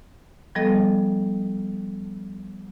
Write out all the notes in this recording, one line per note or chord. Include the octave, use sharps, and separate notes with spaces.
F3 G3 B3 A4 D#5